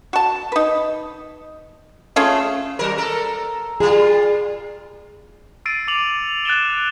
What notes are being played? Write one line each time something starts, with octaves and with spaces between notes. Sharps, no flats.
F#4 A5
D#4 B4
A3 C#4 F4 G#4
F#3 A#4
A4 A#4
G3 F4 G#4
E6 A6 C7 D7 D#7
D6 C#7 F7 F#7
F#6 A6 D7 E7 G7